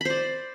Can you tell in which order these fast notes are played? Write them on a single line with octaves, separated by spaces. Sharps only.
B5 C5 D5